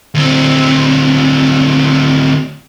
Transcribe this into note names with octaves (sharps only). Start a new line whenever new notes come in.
D2 C4